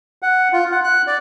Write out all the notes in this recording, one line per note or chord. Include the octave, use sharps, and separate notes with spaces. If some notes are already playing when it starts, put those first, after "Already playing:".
F#5
F4
F#5
F#6
D5